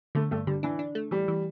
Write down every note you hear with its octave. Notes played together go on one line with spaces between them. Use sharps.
D3 A3
G2 A3
D3 G3
E3 D4
D4
A3
E3 G3
E3